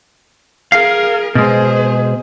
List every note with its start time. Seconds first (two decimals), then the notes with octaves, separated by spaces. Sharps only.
0.72 G#4 A#4 F5
1.35 B2 G#3 G#4 C5